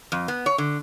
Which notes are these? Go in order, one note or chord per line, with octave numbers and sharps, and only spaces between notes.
F2
B3
C#5
D3